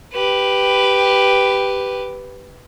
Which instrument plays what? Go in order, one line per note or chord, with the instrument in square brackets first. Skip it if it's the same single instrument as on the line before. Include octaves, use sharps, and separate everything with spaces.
[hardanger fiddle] G4 B4